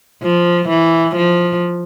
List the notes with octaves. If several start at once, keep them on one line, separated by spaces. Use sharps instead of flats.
F3
E3
F3